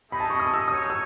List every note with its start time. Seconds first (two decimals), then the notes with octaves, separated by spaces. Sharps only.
0.11 A3 D#4 G#4 D#5 B5
0.20 A5
0.30 C#6
0.40 D#6
0.54 E6
0.68 D#4 F#4 C#5 D#6
0.90 E6